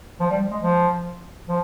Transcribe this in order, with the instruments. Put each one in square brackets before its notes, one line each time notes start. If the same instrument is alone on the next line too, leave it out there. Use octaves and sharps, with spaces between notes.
[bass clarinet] F3
G3
G#3
F3
F3